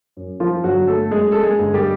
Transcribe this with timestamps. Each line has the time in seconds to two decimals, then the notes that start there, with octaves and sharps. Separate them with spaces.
0.17 F#2
0.40 F3 F4
0.64 G1 F#3 F#4
0.87 A3 A4
1.11 F#2 G#3 G#4
1.32 A4
1.43 G#3 G#4
1.59 G1
1.74 G3 G4